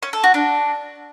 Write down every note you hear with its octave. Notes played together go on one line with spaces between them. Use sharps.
C#4
A4
F#4
D4